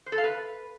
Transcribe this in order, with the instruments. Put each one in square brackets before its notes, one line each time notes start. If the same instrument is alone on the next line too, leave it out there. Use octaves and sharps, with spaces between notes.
[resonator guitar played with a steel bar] C5
A4
F5
B4